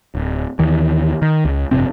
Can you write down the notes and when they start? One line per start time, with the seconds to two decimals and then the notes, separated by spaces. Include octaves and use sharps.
0.15 D1
0.59 D#2 D#3 E3
1.22 D#3
1.45 C#2
1.71 G1 F2 C3 C4